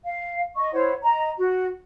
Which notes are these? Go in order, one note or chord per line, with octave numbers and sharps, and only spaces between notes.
F5
D#5 C#6
E4 C5 C#5 F#5
D#5 A#5
F#4